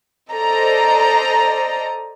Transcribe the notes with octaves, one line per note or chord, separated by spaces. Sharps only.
A4 C5 D5 D#5 A#5